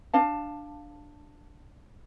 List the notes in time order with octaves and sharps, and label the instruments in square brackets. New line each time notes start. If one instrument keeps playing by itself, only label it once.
[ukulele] D4 F5 A5